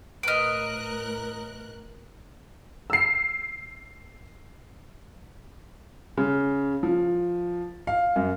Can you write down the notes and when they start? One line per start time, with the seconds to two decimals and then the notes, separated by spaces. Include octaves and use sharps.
0.23 A2 A#4 B4 D#5 F6 F#6 D7
2.90 E6 C7
6.17 C#3
6.83 F3
7.87 F5
8.16 F#2